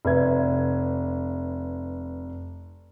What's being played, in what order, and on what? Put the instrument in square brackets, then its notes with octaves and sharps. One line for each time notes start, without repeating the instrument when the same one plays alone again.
[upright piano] F1 B4 E5 G#6